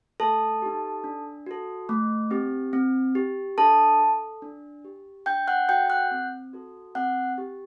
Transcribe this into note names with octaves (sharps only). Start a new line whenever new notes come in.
A3 A4 A5
D#4 G4
D4
F#4 A4
A3
C4 G4
C4
G4
D4 A4 A5
A4
D4
G4
D4 G5 G6
F#5 F#6
F#4 A4 G5 G6
G6
F#5 F#6
C4
F#4 A4
C4 F#5 F#6
G4